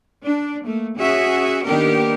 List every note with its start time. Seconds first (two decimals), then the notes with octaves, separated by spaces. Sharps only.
0.24 D4
0.65 A3 A#3
0.98 C#4 F#4 G#4 E5
1.66 D#3 A#3 B3 D4 G4 A#4